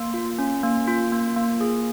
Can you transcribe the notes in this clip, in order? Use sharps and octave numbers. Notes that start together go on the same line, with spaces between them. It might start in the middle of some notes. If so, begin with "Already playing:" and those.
Already playing: A#3 C6
F4
C#4
A#3
F4
A#3
A#3
G#4